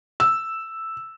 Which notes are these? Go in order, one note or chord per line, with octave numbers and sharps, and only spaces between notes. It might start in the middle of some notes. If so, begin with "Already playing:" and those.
E6